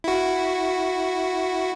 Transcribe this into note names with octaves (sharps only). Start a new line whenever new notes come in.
E4 F#4